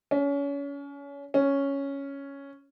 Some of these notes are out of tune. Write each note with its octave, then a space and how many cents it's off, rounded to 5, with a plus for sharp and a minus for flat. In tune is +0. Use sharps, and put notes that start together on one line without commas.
C#4 +30
C#4 +0